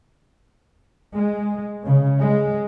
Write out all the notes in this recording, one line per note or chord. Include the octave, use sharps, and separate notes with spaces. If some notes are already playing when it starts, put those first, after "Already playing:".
G#3
C#3
G#3